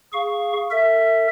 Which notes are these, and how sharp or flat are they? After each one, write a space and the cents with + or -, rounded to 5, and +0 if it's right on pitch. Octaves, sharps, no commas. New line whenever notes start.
G#4 +0 F5 +0 C#6 +0
A4 +45 E5 +0